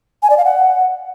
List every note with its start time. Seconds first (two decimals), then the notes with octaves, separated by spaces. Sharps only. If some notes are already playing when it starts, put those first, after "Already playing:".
0.23 G#5
0.30 D5
0.37 F5
0.45 F#5